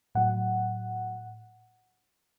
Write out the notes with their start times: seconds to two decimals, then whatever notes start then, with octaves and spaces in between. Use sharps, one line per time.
0.15 A2 F#3 F#5